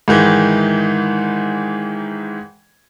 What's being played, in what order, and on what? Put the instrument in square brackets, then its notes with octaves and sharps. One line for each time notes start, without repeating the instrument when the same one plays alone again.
[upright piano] G#2 D#3 E3